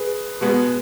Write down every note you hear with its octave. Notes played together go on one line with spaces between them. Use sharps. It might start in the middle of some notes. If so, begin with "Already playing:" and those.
Already playing: G#4 B4
B2 G#3 B3